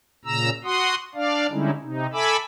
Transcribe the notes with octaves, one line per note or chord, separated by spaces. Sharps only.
A#2 C#3 A#5 E6
F#4 F#5 C6 D#6
D4 D5 F5
D3 G3 G#3 C#4 D#4 E4
C3 D#4
A4 E5 G#5 B5 D6 E6